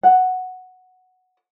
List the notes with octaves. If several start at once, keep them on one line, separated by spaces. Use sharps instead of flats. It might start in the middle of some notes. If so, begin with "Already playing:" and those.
F#5